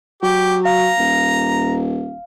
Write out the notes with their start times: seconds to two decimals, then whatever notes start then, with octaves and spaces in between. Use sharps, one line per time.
0.23 F#3 G4
0.65 F5 A#5
0.99 D#1